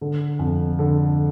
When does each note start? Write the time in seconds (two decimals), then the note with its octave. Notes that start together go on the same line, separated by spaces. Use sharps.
0.01 D3
0.39 F2
0.79 D3